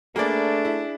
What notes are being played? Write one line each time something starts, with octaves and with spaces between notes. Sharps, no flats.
A3 A#3 D4 G#4 B4 D5 B5
E4